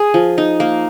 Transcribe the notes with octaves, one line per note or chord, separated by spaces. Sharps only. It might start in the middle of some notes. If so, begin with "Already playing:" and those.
Already playing: G#4
F3
D#4
A#3